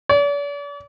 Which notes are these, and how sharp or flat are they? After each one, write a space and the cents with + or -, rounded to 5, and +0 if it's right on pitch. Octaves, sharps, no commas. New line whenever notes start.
D5 -45